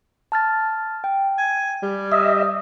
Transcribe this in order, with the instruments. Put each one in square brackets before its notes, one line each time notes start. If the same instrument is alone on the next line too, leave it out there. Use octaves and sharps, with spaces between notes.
[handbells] A5 F6 A6
G5
[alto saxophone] G#5
G3
[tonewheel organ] D#5 E5 [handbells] D#6